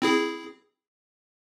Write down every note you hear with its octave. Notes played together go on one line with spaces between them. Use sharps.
C4 E4 G#4